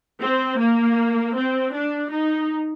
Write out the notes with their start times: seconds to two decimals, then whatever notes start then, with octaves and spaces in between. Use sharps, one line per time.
0.21 C4
0.59 A#3
1.35 C4
1.73 D4
2.11 D#4